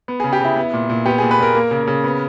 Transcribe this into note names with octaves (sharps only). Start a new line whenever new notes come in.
B3
G#4
C#3
G4
C#3 E4
B3
A#2
A#2
B3 G4
G#4
A#2
B4
A#2 A#4
A#3
C#3
C#3
B3